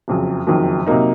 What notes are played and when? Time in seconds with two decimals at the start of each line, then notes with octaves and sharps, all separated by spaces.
0.08 F#1 F2 C#3 F#3
0.47 F#1 F2 D#3 F#3
0.87 C3 F#3 A#3 D#4